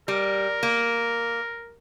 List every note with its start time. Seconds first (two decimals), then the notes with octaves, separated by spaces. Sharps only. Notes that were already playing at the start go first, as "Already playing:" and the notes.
0.08 G3 A#4
0.63 A#3